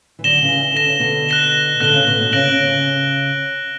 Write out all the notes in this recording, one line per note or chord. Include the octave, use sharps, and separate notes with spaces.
E3
D3 F#3 A#6 E7 G7
C#3 E3
E3
D3 A#6 E7 G7
C#3
B2 D3
F#6 A#6 E7 G7
B2 D3 F#6 A#6 E7 G7
C#3
B2
B2
C#3 F#6 A#6 D7 F#7
C#3
C#3